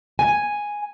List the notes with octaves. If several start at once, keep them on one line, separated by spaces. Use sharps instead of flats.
G#5